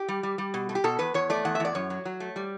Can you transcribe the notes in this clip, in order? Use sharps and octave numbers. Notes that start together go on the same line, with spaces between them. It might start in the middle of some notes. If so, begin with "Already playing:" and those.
Already playing: G4
G3
G3
G3
B2
A3
G4
B2 A4
E2 B4
E2 C#5
A3 D5
E2 F#5
E5
E2 D5
F#2 C#5
F#3
F#3
A3
G3